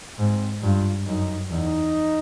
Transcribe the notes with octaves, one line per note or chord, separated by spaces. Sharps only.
G#2 C4
G2 F4
F#2 D#4
E2 D#4